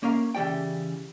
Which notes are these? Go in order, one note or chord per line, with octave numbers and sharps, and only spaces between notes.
A#3 C#4 A#4 F5
C#3 E3 G4 D5 G5